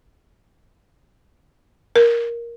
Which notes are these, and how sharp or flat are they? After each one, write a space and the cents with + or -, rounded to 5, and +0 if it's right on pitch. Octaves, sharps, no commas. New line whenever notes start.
A#4 +10